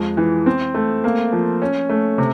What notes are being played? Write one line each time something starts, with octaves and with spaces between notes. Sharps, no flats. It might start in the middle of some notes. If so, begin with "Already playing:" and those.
Already playing: F2 G#3
E3
C4
A3
A#3
F3
C#4
A3
C3